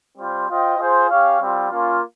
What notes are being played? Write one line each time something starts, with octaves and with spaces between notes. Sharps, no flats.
G3 C4 F4 C5
F4 C5 D#5 G5
F4 G#4 C5
C#4 G4 C#5 F5
G3 C4 F4
A#3 C#4 F4